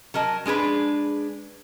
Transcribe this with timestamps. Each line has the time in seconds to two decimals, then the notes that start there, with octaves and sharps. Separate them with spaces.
0.14 F#3 A#4 D#5 A5
0.46 G#3 D4 G#4 B4